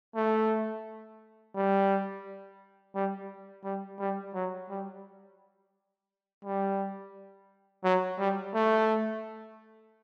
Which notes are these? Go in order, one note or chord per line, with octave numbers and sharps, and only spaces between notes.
A3
G3
G3
G3
G3
F#3
G3
G3
F#3
G3
A3